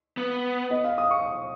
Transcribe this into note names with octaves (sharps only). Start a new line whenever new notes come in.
B3
D#5
F5
D#6
C#6